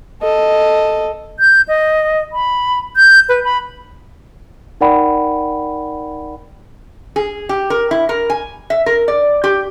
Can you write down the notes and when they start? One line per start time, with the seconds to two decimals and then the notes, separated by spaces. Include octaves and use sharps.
0.21 A4 D#5
1.40 G6
1.68 D#5
2.33 B5
2.97 G6
3.29 B4
3.44 B5
4.81 D#4 A#4 D5 F#5 G5 B5
7.16 G#4
7.49 G4
7.70 A#4
7.91 E4
8.09 A#4
8.30 G#5
8.70 E5
8.86 A#4
9.08 D5
9.44 G4